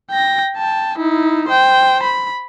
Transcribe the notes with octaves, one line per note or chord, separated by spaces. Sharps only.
G5 A#6
G5 A5
D#4 E4
C5 G5
B5